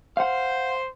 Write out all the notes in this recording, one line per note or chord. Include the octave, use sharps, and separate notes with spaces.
C5 F5 F#5